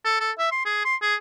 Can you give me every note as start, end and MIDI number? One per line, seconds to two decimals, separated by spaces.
0.05 0.17 69
0.20 0.32 69
0.38 0.48 76
0.52 0.63 84
0.66 0.83 68
0.85 0.95 84
1.02 1.15 68